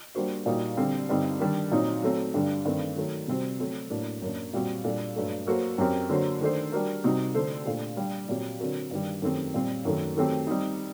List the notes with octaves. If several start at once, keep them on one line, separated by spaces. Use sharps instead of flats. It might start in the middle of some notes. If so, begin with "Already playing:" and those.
G3 A#3 D4 F#4 C5
A#2 G3 A#3 D#4 F#4
D3 G3 C4
G2 D3 G3 C4 D#4
D#3 G3 D4
A#2 F#3 C4 D#4
F#3 A3 C4
G2 D3 G3 D4
G2 D#3 A3 C4
D#3 F#3 A3
C3 G3 C4 F#4 C5
F#3 A3 C4 F#4
A2 F#3 A#3 D4
F#2 F#3 A#3 D4
A#2 G3 C4 F#4
A#2 G3 D4 A4
G2 F#3 A3
F#3 A#3 F#4 A4 C5
F#2 F#3 C4 G4 A#4
D3 F#3 A#3 F#4 C5
D#3 A3 D4 A4 C5
G3 D4 F#4 A#4
C3 G3 C4 D#4 F#4
D3 A3 D4 A4 C5
A#2 A3 D4 G4
G3 D4 G4
A#2 F#3 C4 G4
D3 F#3 C4 F#4 A#4
G2 D#3 G3
F#2 D#3 A3 C4 G4
A#2 G3 C4
F#2 D#3 A3
D#3 F#3 A3 C4 G4
G3 C4 D#4